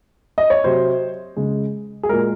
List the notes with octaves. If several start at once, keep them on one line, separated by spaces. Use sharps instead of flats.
D#5
C#5
C3 F#3 C5
C#3 G#3
G#4
A#2 G#3 A#4